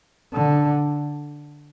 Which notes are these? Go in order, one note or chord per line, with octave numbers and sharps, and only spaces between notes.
D3